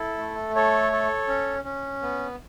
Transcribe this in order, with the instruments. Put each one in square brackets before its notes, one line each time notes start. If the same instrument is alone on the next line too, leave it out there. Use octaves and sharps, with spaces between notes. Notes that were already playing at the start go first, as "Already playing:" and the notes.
Already playing: [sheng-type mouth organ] E4 A4
A3
A4 C#5
A4
C#4
C#4
B3